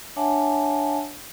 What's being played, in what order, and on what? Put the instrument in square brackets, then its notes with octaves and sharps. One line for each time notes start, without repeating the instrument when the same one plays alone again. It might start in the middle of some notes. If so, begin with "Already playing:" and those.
[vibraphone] D4 C#5 E5 F#5 G#5 A5